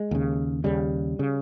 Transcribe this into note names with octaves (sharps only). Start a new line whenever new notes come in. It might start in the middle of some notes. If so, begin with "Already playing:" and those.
Already playing: G#3
D#2 C#3
D#2 C#3 G3
C#3